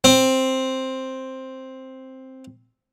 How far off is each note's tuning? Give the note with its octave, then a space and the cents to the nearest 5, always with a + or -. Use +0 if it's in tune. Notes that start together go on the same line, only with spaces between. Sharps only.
C4 +5